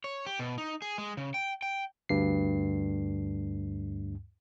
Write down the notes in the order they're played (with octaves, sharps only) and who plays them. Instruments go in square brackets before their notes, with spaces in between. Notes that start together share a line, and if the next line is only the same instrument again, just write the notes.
[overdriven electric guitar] C#5
G4
B2
D#4
G#4
G#3
C#3
G5
G5
[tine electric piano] D2 G2 C7